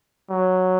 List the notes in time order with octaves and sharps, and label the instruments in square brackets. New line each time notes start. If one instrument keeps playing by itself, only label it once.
[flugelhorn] F#3